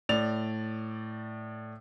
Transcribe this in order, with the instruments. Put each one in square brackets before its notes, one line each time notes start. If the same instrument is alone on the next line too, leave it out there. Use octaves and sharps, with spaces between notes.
[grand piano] A2 D5 A6 F7